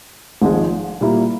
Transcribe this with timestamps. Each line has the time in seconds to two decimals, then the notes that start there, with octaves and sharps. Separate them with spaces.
0.42 G#1 G#2 F3 G#3
1.01 A#2 G3 A#3 E4